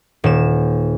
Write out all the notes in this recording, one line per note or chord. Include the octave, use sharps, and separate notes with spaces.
D#1 E7